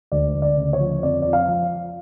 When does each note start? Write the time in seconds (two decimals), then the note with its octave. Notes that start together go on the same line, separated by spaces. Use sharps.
0.12 D2 D5
0.35 D2
0.42 D5
0.57 C#3
0.73 C#5
0.80 F3
1.03 F2 D5
1.22 F3 D5
1.33 F5
1.48 F3